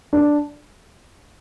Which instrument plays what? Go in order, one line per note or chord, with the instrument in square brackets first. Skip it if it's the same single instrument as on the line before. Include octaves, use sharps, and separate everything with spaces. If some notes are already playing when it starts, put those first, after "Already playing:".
[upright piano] D4